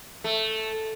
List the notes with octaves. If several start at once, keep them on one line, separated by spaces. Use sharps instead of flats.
A3